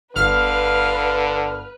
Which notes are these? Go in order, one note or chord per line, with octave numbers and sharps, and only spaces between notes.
G1 D3 B4 F5 F6